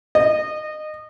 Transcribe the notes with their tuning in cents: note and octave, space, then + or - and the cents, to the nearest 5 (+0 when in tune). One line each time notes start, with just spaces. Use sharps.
D#5 -25